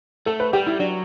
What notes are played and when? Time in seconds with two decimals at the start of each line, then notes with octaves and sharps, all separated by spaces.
0.26 A3 A4
0.40 B4
0.53 G3 G4
0.67 E4
0.80 F#3 D4